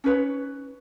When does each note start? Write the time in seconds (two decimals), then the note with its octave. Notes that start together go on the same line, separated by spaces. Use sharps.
0.04 C#4 D#4 B4 C#5